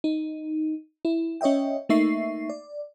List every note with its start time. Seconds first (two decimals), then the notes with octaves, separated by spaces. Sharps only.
0.04 D#4
1.05 E4
1.41 C#4 C#5 D#5 E5 G5
1.89 A3 A#3 D#4 E5 C#6 C7
2.50 D5